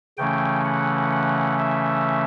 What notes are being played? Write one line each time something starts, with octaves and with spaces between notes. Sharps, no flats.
C#3 E3 A3 C#4 G5
F#5
F#5
E5